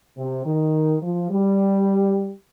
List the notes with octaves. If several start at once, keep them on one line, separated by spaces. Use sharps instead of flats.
C3
D#3
F3
G3